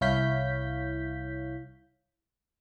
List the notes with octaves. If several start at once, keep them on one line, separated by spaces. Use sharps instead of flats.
C2 E4 C#5 F5 G6 B6